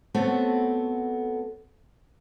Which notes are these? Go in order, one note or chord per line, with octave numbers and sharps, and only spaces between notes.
A3 B3 C4 F#4 A4 C#5